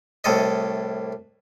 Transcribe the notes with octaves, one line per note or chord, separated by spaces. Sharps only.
C2 A2 A4 D#5